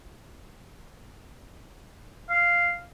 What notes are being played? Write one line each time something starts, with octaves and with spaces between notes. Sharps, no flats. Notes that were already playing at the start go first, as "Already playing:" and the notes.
F5